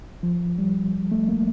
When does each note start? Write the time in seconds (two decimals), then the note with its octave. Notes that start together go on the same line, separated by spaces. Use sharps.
0.23 F3
0.58 G3
1.12 A3
1.29 A#3